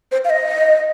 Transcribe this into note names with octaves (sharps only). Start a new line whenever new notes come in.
C5
F5
D#5